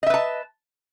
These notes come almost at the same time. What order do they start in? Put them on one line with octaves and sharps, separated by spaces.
D#5 E5 B4 A5